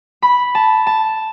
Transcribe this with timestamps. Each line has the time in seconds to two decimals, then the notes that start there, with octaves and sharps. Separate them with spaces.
0.22 B5
0.55 A5
0.87 A5